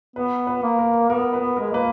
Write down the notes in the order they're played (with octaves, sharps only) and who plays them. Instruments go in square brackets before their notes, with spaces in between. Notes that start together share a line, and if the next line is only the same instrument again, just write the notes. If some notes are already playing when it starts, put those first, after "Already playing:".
[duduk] B3 [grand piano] B4
[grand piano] B4
[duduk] A#3
[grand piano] A#4
[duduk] B3 [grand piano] A#4
[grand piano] B4
[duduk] B3
[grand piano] A#4
[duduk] G#3
[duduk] A#3 [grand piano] B4